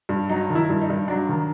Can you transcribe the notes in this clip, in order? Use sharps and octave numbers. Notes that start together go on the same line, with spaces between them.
G2
F#3 D#4
D#3
E4
G2
D#4
G2
F#3 D4
D#3